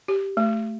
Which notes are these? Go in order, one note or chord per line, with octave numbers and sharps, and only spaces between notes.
G4
A3